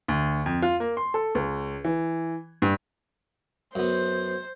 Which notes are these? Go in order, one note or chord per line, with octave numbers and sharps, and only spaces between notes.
D2
F2
F4
A#3
C6
A4
C#2
E3
G2
F#2 B3 C5